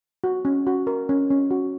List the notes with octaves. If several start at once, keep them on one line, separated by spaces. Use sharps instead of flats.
F#4
C#4
F#4
A#4
C#4
C#4
F#4